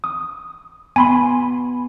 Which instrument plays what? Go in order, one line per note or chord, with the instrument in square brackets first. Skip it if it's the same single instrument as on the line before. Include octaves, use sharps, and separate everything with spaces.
[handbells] D#6
[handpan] B3 [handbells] G#5 B5 C6